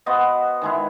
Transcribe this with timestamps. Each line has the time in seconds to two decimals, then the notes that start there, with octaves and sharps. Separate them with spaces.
0.06 B3 F#4 C5 D#5
0.62 D#3 G#3 E4